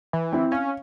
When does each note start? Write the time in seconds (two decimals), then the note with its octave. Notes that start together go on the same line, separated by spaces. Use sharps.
0.13 E3
0.33 C4 E4
0.52 C#4 F5